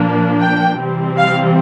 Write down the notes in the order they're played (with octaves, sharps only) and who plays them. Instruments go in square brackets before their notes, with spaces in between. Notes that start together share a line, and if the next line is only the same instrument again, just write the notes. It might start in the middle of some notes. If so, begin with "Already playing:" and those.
Already playing: [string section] A#2 F3 A#3 D4
G5
C3 E3 G3 C4
F5